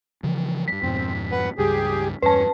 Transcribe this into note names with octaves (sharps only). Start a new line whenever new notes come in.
C#3 E3 F3
G2 F#3 B6
F2 G#2 B2 C4
B4 F#5
C#2 G2 G4 G#4
E2 G2 C#4 B4 A5